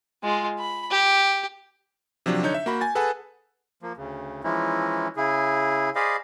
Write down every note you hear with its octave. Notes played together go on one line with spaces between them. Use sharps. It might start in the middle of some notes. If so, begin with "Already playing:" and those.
G#3 F4
B5
G4
C3 F3 F#3 D4
D3 D#4 C#5 G6
E5
A#3 F#4 B5
G#5 A6
G#4 A4 B4 F#5 G#5 A5
F3 A#3
D2 C#3
E3 F3 G#3 C#4 D#4 E4
C#3 E4 G#4
G#4 C5 D5 D#5 F5 B5